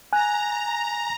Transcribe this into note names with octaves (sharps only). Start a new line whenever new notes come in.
G#5 A#5 F#6